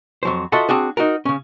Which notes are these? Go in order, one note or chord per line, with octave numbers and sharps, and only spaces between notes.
F2 F#3 C5
F4 F#4 A4 D#5 E5 F#5
C4 D4 F#4 G#4
D#4 F#4 A#4
C#3 C#4